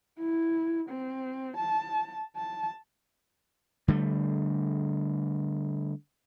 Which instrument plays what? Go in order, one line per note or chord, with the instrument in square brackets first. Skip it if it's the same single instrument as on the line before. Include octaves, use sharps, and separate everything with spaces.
[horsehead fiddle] E4
C4
A5
A5
[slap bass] D3 G3 A3